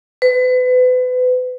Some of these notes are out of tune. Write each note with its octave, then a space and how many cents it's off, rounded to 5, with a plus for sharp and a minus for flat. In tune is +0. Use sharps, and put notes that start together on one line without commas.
B4 +35